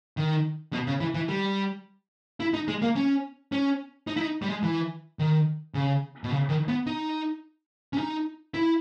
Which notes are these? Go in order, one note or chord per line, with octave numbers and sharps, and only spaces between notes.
D#3
B2
C#3
E3
E3
G3
E4
D#4
G#3
A#3
C#4
C#4
D#4
E4
D#4
G3
G#3
E3
D#3
C#3
B2
C#3
D#3
B3
D#4
C#4
D#4
E4